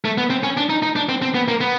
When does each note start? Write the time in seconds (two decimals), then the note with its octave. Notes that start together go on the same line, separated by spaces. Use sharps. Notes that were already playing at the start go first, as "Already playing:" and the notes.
0.05 A3
0.18 B3
0.30 C4
0.43 C#4
0.57 D4
0.70 D#4
0.83 D#4
0.96 D4
1.09 C4
1.22 C4
1.35 B3
1.48 A#3
1.61 B3